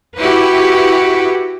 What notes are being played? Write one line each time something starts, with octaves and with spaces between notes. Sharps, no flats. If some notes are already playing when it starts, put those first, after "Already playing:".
E4 F#4 G4 B4